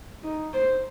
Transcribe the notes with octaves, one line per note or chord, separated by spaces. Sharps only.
D#4
C5